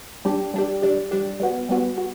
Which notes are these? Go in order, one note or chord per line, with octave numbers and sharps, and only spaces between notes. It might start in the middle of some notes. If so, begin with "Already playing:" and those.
G3 D4 G4
G3 D4 G4
G3 D4 G4
G3 D4 G4
G3 B3 F#4
G3 B3 F#4
F#4